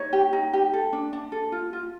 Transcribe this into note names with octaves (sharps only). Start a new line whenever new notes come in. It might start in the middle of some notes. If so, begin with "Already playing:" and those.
Already playing: D#4 C#5
G4
D#4
G4
A4
D4
D4
A4
F4
F4